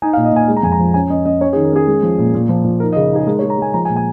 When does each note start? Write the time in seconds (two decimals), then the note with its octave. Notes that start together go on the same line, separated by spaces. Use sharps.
0.02 D#4 G#5
0.13 F5
0.17 A#2
0.25 D#5
0.32 A#2 G#5
0.48 G#3
0.57 A#5
0.63 F2 G#5
0.72 A#5
0.79 F3
0.94 C#4 G#5
1.10 C#4 D#5
1.25 C#4 D#5
1.41 C#4 C#5
1.53 G#4
1.56 D#3
1.65 A#4
1.73 C#4 G#4
1.87 G#3
2.03 F3
2.19 A#2
2.34 A#2
2.49 F3
2.65 F3
2.80 D#4 A#4
2.93 D#5
2.96 C#3
3.12 D#4 G#4
3.27 G#3 A#4
3.39 C#5
3.42 G#3
3.50 A#5
3.58 G#3 G#5
3.74 F3 A#5
3.85 G#5
3.89 A#2
3.96 G#5